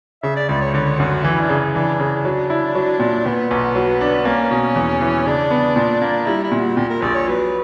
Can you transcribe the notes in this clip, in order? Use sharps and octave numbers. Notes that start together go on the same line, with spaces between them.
C#3 E5
D5
C#2 D5
C#5
D3 C#5
F#2 F#4
E3 E4
D4
C#3
E3 D4
C#3
F#3
E4
F#3
A#2
A#2 B3
B1
F#3
D4
A#3 C#4
B2
E2
E3
C#3 D4
B3
A#2
A#3
G3 E4
E4
A#2
F#4
A#2 G4
A#4
A#1 D5
C#5
F#3 B4